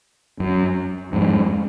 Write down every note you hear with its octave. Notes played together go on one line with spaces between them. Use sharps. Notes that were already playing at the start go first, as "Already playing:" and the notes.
F#2
F2 G#2